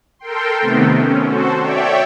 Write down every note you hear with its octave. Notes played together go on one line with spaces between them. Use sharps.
A4 A#4 G5 C6
C3 D#3 A3 B3 C4
C#4
F#4 A4 C5
C#5 D5 E5 G5